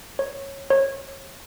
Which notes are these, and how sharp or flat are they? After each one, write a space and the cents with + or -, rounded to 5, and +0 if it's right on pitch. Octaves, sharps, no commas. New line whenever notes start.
C#5 -15
C#5 -30